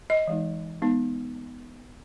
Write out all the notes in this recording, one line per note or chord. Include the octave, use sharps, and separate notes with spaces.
D#5
E3 G#3 D#4
G#3 B3 D#4